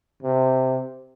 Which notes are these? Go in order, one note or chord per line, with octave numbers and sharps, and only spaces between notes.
C3